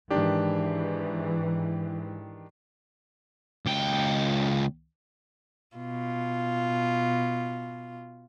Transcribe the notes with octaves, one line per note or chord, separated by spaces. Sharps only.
G#2 D#3 E3 D4 G4
C#2 G5
B2 F4